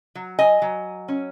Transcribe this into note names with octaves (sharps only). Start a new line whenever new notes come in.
F#3
D#5 G#5
F#3
C#4